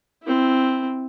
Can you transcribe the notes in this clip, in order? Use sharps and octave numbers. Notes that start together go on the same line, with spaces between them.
C4 E4